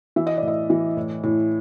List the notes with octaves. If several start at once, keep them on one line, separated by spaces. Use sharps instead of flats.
E3 E5
D#5
D5
A2
D#5
E3
A2
A2